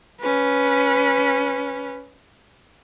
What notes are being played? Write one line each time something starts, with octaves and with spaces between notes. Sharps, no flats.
C#4 B4